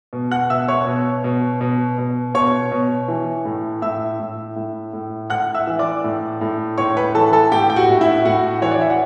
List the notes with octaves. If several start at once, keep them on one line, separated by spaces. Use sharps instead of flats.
B2
F#5 F#6
B2 E5 E6
C#5 C#6
B2
B2
B2
B2
B2 C#5 C#6
B2
E3
A2
A2 E5 E6
A2
A2
A2
A2 F#5 F#6
E5 E6
E3
D5 D6
A2
A2
A2 C#5 C#6
B4 B5
E3 A4 A5
A4 A5
A2 G4 G5
G5
F#4 F#5
A2
E4 E5
A2 F#4 F#5
E3 C#5
D5
E5
F#5